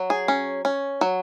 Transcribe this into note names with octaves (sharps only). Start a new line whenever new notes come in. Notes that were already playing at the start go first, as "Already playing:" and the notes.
Already playing: F#3
G#4
C#4
C#4
F#3